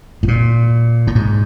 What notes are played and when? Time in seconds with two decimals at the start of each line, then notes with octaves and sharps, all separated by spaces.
0.23 A2
0.28 A#2
1.07 A2
1.15 G#2